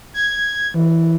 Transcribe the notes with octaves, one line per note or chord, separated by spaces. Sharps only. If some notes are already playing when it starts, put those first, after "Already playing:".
G#6
E3